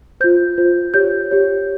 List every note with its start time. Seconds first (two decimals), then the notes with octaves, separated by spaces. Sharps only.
0.20 F4 C5 G6
0.58 F4 C5
0.94 G4 C#5 G6
1.31 G4 C#5